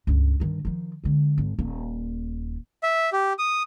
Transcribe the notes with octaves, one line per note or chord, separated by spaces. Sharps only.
C#2 G2
G2 D#3
D#3 F3
D3 G#3
G#1
D#1 A#3
E5
G4
D#6